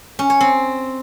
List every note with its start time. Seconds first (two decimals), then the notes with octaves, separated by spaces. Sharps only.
0.19 C#4
0.30 C#5
0.41 C4